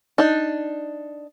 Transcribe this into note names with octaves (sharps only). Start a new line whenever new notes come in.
D4 D#4